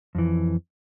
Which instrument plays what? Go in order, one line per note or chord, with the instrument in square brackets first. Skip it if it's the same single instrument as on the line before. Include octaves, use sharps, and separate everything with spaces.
[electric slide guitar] F2 E3